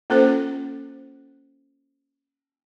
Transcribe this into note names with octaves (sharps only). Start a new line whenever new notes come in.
A#3 C#4 F4 A4 C5